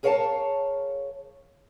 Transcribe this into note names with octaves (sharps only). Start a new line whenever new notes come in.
G#4 A#4 C#5 F5 G#5 A5